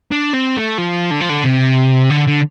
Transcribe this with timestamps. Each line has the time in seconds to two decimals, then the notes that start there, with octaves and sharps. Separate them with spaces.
0.12 D4
0.34 C4
0.57 A3
0.78 F3
1.11 D3
1.21 F3
1.30 D3
1.45 C3
2.11 D3
2.28 D3